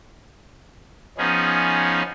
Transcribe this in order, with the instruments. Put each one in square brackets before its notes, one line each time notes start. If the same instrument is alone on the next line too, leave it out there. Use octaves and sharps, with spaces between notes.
[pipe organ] F3 B3 C#4 D#4 G#4